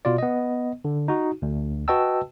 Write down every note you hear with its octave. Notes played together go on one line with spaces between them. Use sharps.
B2 F4 D5
B3 D#5
D3
D#4 F#4
D2
F#4 B4 D#5 G5 A5 E6